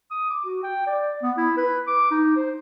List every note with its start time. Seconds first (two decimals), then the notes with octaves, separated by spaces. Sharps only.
0.11 D#6
0.30 D6
0.45 F#4
0.63 G5
0.86 D5
1.22 B3
1.37 E4
1.57 B4
1.87 D6
2.11 D#4
2.36 C5